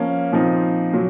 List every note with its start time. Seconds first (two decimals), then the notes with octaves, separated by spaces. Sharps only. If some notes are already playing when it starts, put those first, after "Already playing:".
Already playing: F3 A#3 C#4
0.32 A#2 F3 C4 D#4
0.93 A#2 F#3